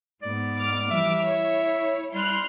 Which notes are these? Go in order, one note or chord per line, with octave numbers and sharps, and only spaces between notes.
G#2 B3 D5
D6 F6
E3 G3 E5
E4 C#5
G3 C6 F6 F#6